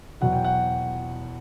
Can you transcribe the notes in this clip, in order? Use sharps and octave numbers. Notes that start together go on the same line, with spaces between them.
E2 B2 F#3 F#5
G5
F#5